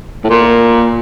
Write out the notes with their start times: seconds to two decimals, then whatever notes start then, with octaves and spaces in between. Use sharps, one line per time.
0.24 A2
0.29 A#2